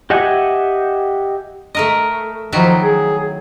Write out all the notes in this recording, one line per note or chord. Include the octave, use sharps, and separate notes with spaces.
G4 D#5 E5 F#5 G#5
A3 A#4 D#5
D#3 F3 F#3 E4
G#4